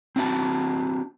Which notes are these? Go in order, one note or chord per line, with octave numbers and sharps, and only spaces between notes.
C4 D4 F#4 F5 A5